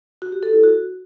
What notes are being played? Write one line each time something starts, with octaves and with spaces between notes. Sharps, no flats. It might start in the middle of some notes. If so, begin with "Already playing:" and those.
F#4
G4
A4
E4
F#4